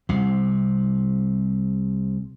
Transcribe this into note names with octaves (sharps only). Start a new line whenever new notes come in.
C2 C3